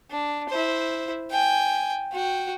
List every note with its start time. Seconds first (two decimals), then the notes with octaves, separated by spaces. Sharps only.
0.11 D4
0.49 E4 C5
1.31 G5 G#5
2.13 F#4 G5